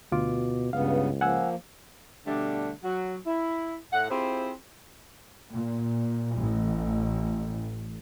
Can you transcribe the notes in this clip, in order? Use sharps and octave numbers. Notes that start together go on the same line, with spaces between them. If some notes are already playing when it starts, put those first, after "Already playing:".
D2 B2 F4 D6
C#2 G2 C#3 B3 F5
F3 A#3 F#5 G#5 E6
B2 D3 G3 A3 D4
F#3 F#4
E4
A2 F#5
C4 E4 F4 G4 G#4 C5
A#2
A1